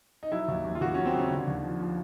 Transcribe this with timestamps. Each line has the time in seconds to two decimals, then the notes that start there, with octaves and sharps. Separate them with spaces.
0.23 D#4
0.32 F#3 E4
0.48 D#2
0.64 D#2
0.75 F4
0.81 D#2 F#4
0.94 C#4
0.98 F#3
1.06 C4
1.14 C#3 C#4
1.30 D3
1.47 D#2
1.64 F3
1.79 F3